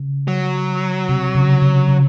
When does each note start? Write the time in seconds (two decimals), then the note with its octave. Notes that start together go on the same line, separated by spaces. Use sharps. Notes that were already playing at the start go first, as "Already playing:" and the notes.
Already playing: C#3
0.28 F#3
1.09 C3
1.35 C#3
1.62 C#3
1.88 C#3